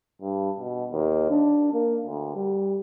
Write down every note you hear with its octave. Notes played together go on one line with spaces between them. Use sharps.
G2
B2
D#2
D4
A#3
D2
G3